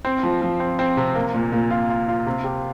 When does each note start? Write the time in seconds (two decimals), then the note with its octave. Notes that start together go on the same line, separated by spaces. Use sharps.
0.05 C4
0.23 F3
0.42 F3
0.60 C4
0.79 C4
0.97 C3
1.15 A#3
1.34 A#2
1.52 A#2
1.71 F4
1.89 F4
2.08 F4
2.27 C3
2.44 G4